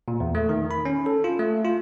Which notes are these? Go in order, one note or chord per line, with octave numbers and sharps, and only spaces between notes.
A#2
E2
A3
D#3
B5
C#4
A4
F4
A3
F4